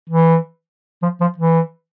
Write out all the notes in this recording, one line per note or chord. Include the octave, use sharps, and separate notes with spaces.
E3
F3
F3
E3